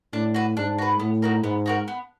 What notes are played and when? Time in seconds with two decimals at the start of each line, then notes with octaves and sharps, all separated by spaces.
0.13 A2 D4
0.34 F#4 B4
0.57 G#2 D4
0.78 F#4 B4
0.99 A2 B3
1.22 D#4 F#4 A#4
1.43 G#2 B3
1.66 D#4 F#4 A#4
1.88 B3